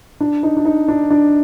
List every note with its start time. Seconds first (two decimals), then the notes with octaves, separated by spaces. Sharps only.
0.20 D4
0.43 D#4
0.57 D4
0.65 D#4
0.88 D4
1.11 D4